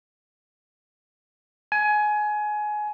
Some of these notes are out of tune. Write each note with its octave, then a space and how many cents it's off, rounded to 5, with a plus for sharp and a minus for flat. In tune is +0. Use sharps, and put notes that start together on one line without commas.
G#5 +20